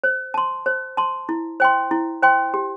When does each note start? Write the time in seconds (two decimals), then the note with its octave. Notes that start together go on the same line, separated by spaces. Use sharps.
0.04 C5
0.34 A5 C6
0.66 C5
0.97 A5 C6
1.29 E4
1.60 C5 G5 C6
1.91 E4
2.22 C5 G5 C6
2.54 G4